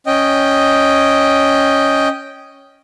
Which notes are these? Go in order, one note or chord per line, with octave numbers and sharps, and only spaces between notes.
C#4 D#5 G5